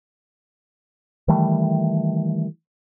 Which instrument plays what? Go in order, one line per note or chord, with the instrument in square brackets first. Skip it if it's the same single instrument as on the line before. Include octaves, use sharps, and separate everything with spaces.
[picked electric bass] D#3 E3 G3 A3